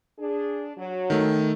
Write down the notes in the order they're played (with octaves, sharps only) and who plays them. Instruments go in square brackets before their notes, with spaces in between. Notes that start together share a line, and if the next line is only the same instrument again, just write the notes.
[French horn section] D4 G#4
F#3
[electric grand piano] D#3 A3